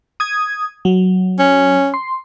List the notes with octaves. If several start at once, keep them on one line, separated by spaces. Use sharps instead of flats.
D#6 G#6
F#3
C#4
C6